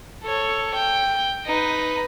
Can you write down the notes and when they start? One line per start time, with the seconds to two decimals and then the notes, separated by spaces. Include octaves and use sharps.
0.24 A4 C#5
0.74 G5
1.46 D#4 B4